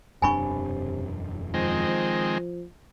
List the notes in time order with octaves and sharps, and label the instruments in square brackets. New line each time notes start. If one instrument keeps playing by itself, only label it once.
[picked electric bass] E1 F#2 D4 [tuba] C3 [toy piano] G#5 B5 C#6
[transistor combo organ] D#3 G#3 C4 [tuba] F3